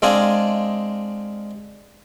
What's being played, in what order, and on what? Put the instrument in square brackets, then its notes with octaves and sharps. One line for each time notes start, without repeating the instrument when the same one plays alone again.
[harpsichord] G#3 C4 D4 D#5 F5 G#5